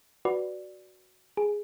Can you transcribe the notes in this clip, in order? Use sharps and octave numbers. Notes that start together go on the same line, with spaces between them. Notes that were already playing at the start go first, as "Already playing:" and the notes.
F#4 B4 D5
G#4